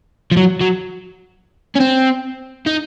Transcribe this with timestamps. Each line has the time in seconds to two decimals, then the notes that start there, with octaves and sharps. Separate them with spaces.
0.31 F3
0.37 F#3
0.61 F#3
1.75 C#4
1.80 C4
2.66 D#4